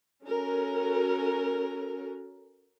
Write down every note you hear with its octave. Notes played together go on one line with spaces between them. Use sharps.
C#4 F#4 A4 A#4